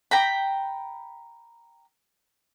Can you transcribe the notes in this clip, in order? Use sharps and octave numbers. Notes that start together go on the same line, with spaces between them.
G5 A#5 B5